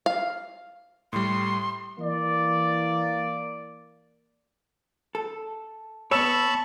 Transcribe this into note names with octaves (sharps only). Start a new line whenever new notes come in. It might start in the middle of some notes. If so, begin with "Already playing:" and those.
F5
A2 G3 C6
E3 A#3 D5
A4
B3 C#5 A5 B5 C#6 E6 E7